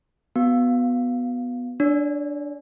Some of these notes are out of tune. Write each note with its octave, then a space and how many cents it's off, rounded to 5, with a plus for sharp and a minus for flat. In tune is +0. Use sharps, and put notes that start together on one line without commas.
B3 +0 F#4 +0 F5 +5
D4 +0 C#5 +40